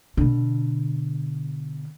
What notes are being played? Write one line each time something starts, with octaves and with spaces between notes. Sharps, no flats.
B2 D3